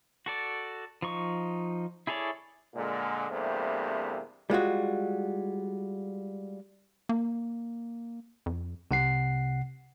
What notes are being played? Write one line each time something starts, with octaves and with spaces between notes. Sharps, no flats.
F#4 A4 D5
F3 D#4 C#6
E4 G#4 A4 C#5 D5
A#2 D3 G#3
E2 G2 C3 A3 A#3 C4
G3 G#3 F4 F#4
A#3
F2
C2 C3 F#5 C7